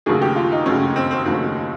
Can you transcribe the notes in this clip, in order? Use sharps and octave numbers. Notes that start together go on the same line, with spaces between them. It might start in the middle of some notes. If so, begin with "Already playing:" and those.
D#2 C#3 F#3 A3 G#4
G4
F4
D#4
D#2 C#3 F#3 A3 C#4
C4
C4
D#2 C#3 F#3 A3 C4